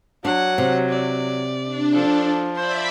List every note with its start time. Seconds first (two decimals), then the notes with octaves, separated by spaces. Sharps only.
0.25 F#3 D4 F#5
0.58 C3
0.90 D5
1.65 D4
1.95 F3 A4
2.56 C5 D5 E5 B5